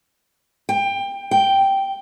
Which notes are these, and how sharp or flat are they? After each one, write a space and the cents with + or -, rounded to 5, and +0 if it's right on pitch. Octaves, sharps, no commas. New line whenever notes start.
G5 +20
G5 -5